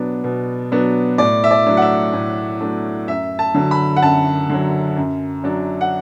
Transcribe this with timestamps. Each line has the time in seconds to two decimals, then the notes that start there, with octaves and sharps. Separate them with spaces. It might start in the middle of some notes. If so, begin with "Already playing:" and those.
Already playing: B2 F#3 B3 D4
0.24 B2
0.72 F#3 B3 D4
1.18 A2 D5
1.44 E5
1.51 D5
1.66 F#3 A3 D4
1.77 F#5
1.82 E5
2.13 A2
2.60 F#3 A3 D4
3.07 F#2 E5
3.39 A5
3.54 D3 F#3
3.71 B5
3.96 F#5
4.02 F#2 A5
4.49 D3 F#3
4.97 F#2
5.44 F#3 D4
5.81 F#5